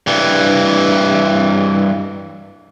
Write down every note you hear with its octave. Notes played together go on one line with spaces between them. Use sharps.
G2 E3